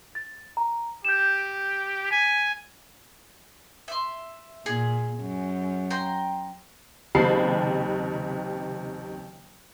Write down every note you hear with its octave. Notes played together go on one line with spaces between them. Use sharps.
A6
A#5
G4 G6 E7
G#5 B6
E5 C6
A#2 G#4
F#2
G5 A#5 C6
F#1 D#2 C3 A5 B5 C7